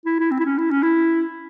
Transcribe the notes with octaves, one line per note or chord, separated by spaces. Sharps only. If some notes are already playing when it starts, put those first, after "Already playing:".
E4
E4
C4
E4
C#4
E4
C#4
E4